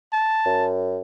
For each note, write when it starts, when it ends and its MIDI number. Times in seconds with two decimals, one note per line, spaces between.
0.13 0.68 81
0.46 1.01 42